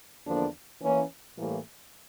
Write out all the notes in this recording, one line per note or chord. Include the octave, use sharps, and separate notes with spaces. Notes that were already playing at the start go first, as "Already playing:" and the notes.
E2 D3 F3 A#3 D4
E3 A#3 C#4
A2 E3 G3 A#3